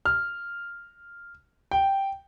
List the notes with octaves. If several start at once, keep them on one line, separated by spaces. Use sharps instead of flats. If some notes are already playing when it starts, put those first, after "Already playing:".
F6
G5